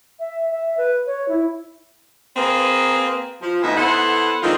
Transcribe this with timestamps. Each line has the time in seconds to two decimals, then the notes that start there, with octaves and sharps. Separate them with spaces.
0.20 E5
0.51 E5
0.78 B4
1.07 C#5
1.29 E4
2.36 A#3 C4 G#4 B4
3.41 F3
3.62 D2 E3 B3 D#4 E5
3.77 B3 E4 A4 C5 F#5
4.42 D#3 F3 G#3 C4 D4 F4